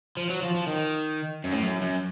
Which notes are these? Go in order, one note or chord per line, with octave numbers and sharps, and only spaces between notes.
F3
F#3
F3
F3
D#3
F#2
A2
F#2
F#2